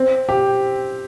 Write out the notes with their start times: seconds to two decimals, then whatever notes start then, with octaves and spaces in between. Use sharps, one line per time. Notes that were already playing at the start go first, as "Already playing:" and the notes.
Already playing: C4
0.29 G4